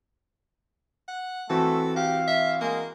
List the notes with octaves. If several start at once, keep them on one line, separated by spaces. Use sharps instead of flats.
F#5
E3 A3 C4 F#4 A4
G4 F5
E5
G#3 A#3